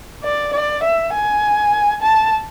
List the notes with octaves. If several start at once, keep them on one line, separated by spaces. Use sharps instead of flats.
D5
D5
E5
G#5
A5